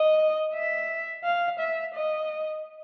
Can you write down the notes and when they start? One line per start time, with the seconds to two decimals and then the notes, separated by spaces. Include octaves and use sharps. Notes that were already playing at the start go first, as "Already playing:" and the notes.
Already playing: D#5
0.54 E5
1.24 F5
1.59 E5
1.94 D#5